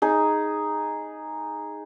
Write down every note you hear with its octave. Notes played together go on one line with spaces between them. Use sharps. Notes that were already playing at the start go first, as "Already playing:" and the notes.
D#4 G#4